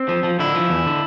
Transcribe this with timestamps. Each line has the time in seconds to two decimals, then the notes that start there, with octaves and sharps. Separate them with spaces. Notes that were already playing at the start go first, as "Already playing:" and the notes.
Already playing: C4
0.09 F3
0.23 F3
0.39 D3 E4
0.55 F3
0.70 E2
0.86 D3